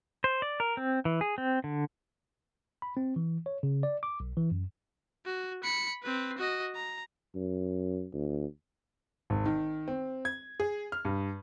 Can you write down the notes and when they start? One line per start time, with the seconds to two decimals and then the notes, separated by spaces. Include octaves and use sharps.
0.24 C5
0.42 D5
0.60 A#4
0.77 C4
1.05 E3
1.21 G#4
1.38 C4
1.64 D3
2.82 B5
2.97 C4
3.16 E3
3.46 C#5
3.63 C#3
3.83 D5
4.03 D6
4.20 B1
4.37 E3
4.51 F#2
5.25 F#4
5.64 B5 C#7
6.03 C4 B4
6.38 F#4 D#5
6.75 A#5
7.35 F#2
8.13 D2
9.30 G#1
9.46 D#3
9.88 C4
10.25 G#6
10.60 G#4
10.92 F6
11.05 G2